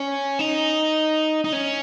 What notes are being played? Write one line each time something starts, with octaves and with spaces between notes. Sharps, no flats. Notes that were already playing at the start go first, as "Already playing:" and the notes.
Already playing: C#4
D#4
D#4
C#4